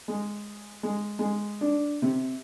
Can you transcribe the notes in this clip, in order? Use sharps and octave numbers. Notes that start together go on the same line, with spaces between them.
G#3
G#3
G#3
D4
C3